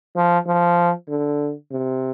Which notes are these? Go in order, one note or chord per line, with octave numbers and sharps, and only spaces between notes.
F3
F3
D3
C3